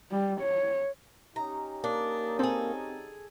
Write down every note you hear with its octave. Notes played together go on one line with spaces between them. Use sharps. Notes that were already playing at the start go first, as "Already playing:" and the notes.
G3
C#5
C#4 D#4 G4 A#5
A#3 D4
C4 G#4 A4